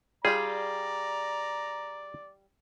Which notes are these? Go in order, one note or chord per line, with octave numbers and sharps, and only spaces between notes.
G3 F4 G4 G#4 D5 A#5